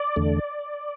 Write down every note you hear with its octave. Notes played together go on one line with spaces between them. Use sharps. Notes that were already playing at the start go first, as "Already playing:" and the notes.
Already playing: D5
E2 D3 A3